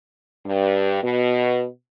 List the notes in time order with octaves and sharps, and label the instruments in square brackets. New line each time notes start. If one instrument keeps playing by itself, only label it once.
[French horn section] G2
B2